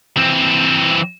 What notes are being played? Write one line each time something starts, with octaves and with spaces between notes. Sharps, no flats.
E3 C4